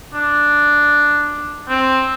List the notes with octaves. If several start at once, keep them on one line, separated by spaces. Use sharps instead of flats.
D4
C4